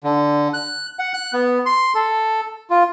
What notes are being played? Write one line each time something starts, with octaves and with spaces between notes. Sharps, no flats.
D3
F#6
F#5
F#6
B3
C6
A4
F4